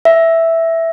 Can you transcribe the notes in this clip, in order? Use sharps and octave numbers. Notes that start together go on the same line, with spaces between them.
E5